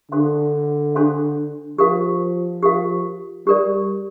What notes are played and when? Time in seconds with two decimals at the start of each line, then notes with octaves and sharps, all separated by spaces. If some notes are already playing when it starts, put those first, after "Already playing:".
0.12 D3 D4 A4 C5 F5 C6
0.95 D4 A4 C5 F5 C6
1.78 F3 G4 A#4 F5
2.63 G4 A#4 F5
3.47 G3 G4 A#4 D5